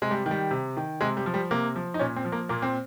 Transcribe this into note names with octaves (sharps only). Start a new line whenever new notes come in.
C3 G#3
G3
D#3
G3
C3
D#3
C3 G#3
G3
F3
G3
C3 A#3
F3
D#4
A#2 C#4
C4
F3
A#3
A#2 A#3
C4